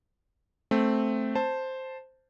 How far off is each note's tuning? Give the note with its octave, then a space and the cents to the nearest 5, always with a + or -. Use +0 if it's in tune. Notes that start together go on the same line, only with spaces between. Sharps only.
A3 +0 C4 +0
C5 +0 A5 +0